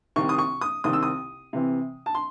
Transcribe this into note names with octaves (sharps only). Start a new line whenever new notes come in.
C2 C3 D#3 C#6
D#6
C#6
D#6
C2 C3 D#3 D#6
E6
D#6
C3 E3 C4
A5
C6